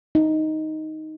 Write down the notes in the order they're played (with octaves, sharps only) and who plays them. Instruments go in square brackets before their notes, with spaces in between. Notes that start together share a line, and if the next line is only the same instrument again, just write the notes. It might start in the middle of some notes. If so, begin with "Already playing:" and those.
[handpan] D#4